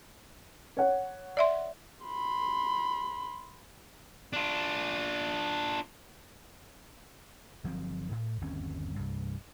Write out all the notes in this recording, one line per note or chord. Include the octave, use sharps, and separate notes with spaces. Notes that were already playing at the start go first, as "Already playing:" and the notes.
C#5 F#5
D5 E5 C6
B5 C6
D4 F4
G1 F3 F#3 C4
A2
G1 D#2 C4 C#4
C2 G2